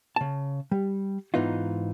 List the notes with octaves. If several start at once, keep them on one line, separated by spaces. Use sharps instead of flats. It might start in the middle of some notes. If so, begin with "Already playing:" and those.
C#3 A5
G3
G#2 E3 B3 D#4 F4